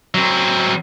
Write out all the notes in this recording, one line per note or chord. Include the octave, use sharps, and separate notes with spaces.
F#3 C4